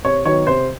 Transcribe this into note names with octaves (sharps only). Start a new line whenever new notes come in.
C3 C#5
D#3 F#3 B3 C#5
C3 C5